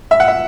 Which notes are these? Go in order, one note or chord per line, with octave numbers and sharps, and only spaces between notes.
E5
F#5
E5